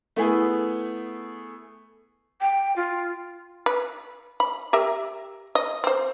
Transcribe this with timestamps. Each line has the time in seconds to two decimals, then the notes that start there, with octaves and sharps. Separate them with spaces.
0.16 A3 B3 E4 G#4
2.41 G5
2.76 F4
3.66 B4
4.40 B5
4.73 G4 A#4 E5
5.55 D#5
5.84 C4 C5